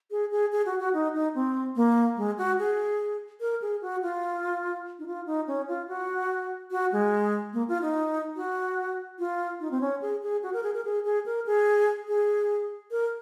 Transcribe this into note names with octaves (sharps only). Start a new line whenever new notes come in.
G#4
G#4
G#4
F#4
F#4
D#4
D#4
C4
A#3
G#3
F#4
G#4
A#4
G#4
F#4
F4
D#4
F4
D#4
C#4
F4
F#4
F#4
G#3
A#3
F4
D#4
F#4
F4
D#4
C4
C#4
G#4
G#4
F#4
A#4
G#4
A#4
G#4
G#4
A#4
G#4
G#4
A#4